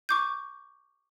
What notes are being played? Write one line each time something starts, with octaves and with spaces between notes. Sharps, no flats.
C#6 D6 G6